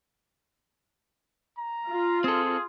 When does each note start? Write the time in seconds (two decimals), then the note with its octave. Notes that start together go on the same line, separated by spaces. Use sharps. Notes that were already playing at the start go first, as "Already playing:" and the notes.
1.57 A#5
1.89 F4
2.24 C4 G#4 A4